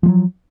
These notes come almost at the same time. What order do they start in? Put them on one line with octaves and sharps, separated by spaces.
F3 G#3 F#3